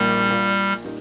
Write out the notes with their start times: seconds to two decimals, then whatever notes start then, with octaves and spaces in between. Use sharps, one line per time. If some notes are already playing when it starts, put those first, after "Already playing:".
Already playing: A#1 A#2 G3 A#3 D#4
0.30 A#2 A#3 F4
0.85 A#2 G3 D#4